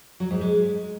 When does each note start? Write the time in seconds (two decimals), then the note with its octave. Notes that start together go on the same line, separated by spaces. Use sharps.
0.20 F#3
0.31 G#2
0.41 G#3